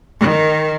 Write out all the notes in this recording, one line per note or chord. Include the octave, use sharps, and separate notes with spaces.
D#3